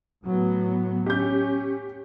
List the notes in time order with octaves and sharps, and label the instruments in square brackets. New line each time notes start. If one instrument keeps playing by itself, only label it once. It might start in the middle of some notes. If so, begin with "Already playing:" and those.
[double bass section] A2 F#3 B3
[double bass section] C#4 [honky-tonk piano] G4 G6